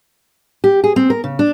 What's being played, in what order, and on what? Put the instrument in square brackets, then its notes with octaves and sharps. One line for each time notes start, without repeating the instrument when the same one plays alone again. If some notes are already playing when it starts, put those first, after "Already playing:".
[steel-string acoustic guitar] G4
G#4
C4
A#4
C#3
D4